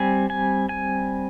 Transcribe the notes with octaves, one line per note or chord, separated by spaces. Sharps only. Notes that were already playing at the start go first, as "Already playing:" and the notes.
Already playing: G3 C4 G#5
G#5
G#5